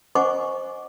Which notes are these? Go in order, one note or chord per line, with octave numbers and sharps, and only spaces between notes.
C5 D#5 F#5 G#5 C#6 D6